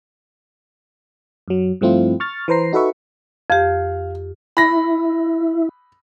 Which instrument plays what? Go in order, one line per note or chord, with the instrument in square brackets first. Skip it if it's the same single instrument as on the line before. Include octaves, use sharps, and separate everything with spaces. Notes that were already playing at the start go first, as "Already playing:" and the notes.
[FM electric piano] F#2 F#3
G2 F3 A3 C4 E4 F4
C#6 F6 A6
E3 B4 C5 A#5 C7
D#4 F#4 A4 B4 E5 C#6
[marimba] F2 G4 [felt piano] F5
[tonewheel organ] E4 [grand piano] B5 A#6